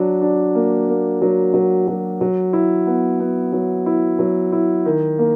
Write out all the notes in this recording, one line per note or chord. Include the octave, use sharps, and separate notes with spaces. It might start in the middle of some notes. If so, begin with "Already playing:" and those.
Already playing: F#3 D4
D4
A#3
A#3
F#3
F#3
F#3
F#3
E4
B3
B3
F#3
E4
F#3
E4
D#3
A#3